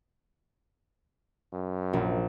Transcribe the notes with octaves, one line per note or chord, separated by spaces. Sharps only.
F#2
A#1